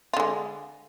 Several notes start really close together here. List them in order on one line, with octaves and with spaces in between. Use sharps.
F4 D3 G#3